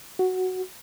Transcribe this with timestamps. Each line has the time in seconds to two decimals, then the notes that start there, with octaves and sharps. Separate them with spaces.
0.19 F#4